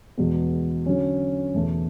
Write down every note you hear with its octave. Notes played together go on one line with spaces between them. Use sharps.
E2 B2 G#3 B3
D3 F#3 C#4
E2 B2 A3